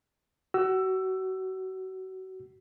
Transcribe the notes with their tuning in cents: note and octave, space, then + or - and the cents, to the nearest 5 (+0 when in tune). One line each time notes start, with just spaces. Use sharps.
F#4 +30 E6 +15